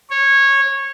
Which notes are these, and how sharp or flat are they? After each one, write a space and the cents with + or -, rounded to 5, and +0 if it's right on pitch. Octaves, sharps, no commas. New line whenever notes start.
C#5 -15